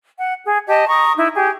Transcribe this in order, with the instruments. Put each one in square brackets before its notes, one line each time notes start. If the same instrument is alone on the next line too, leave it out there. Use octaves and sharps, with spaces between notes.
[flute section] F#5
G#4
G4 D#5 A5
A#5 C#6 D#6
D#4 E4
G4 G#4